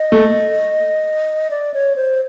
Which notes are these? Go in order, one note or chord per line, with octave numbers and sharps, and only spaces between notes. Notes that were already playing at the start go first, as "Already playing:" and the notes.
Already playing: D#5
A3
D5
C#5
C5